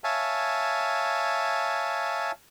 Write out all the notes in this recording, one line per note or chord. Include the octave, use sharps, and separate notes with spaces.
C#5 E5 F5 G#5 A5